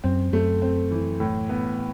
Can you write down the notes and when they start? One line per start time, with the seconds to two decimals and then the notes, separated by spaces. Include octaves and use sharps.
0.04 F#2 C4
0.32 F#2 A3
0.62 C4
0.91 E3
1.20 A2
1.49 B3